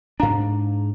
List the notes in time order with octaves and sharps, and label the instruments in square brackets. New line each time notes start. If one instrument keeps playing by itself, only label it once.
[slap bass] G#2 D4 [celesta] F5 A#5